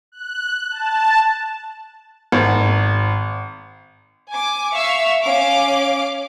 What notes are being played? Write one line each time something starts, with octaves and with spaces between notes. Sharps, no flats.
F#6
A5
G#1
G#5 D6
E5 F5 C#6 E6
C#4 F5 D6